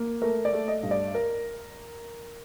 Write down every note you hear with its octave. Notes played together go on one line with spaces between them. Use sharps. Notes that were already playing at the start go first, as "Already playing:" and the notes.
Already playing: A#3
A3 A#4
D5
A3
D#5
G2
D5
A#4